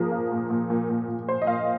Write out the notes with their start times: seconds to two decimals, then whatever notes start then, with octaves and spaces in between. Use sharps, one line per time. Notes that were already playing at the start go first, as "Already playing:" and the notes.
Already playing: A#2 F3 A#3 G#4 A#4
0.12 A#3
0.32 A#2
0.50 A#2
0.70 A#2
0.90 A#2
1.08 A#2
1.29 A#2 C5
1.42 D#5
1.47 A#2 F5